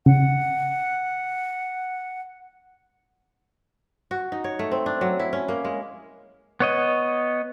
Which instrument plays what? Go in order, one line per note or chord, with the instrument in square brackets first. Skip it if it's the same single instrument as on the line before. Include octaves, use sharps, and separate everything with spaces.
[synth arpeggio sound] C#3 [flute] F#5
[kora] F#4
D#4
C#5
A3
C4
D4
F#3
E4
C#4
A#3
G#3
[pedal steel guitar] B3 C#5 D#5